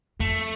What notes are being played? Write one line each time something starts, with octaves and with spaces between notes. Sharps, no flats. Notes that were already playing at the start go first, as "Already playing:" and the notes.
F2 A3